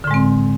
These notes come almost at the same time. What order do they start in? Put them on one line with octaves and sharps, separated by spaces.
D3 A2 G#3 C4